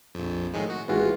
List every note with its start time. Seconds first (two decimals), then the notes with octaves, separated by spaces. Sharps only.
0.15 A#1 F2
0.54 A2 D#3 G#3
0.70 F#4
0.88 G#1 E3 G#3 F4 F#4